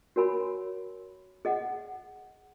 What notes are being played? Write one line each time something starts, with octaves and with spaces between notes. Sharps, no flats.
F#4 A#4 C#5 G#5 B5
G#4 D#5 F#5